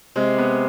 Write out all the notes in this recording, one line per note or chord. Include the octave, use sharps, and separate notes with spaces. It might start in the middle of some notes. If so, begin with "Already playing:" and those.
C3 G#3
B3